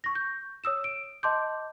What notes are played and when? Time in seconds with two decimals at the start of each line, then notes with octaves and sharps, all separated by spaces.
0.04 C#6 A#6
0.15 G6
0.64 C#5 D#6 E6 E7
0.84 D7
1.23 D#5 A5 C6 D6 G6